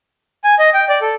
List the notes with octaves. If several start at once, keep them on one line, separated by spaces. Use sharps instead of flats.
G#5
D#5
G5
D5
A4